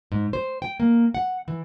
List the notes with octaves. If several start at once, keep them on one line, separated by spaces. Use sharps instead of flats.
G#2
C5
G5
A#3
F#5
E3